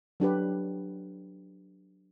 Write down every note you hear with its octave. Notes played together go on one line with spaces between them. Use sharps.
F#3 D4 G4 B4